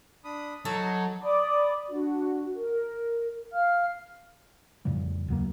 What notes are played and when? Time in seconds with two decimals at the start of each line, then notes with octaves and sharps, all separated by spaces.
0.24 D4 B5 D#6
0.65 F#3 D#4 A4 C#5
1.22 D5 B5 D6 D#6
1.89 D4 F#4
2.54 A#4
3.51 F5 F6
4.85 F2 A2 C#3 G3
5.28 D#2 F#3 A#3